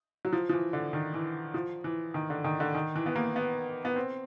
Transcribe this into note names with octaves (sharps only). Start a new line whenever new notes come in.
F#3
F3
F3
E3
D3
D#3
E3
F3
E3
D#3
D3
D#3
D3
D#3
E3
B3
A#3
B3
B3
C4